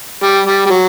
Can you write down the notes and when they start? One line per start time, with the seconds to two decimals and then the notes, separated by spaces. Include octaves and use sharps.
0.23 G3
0.47 G3
0.66 G3
0.70 F#3